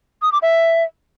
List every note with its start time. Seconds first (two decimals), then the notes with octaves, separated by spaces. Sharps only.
0.22 D#6
0.32 D6
0.42 E5